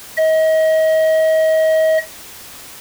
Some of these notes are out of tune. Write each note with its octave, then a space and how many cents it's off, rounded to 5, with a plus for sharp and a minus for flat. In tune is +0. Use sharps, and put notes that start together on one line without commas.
D#5 +35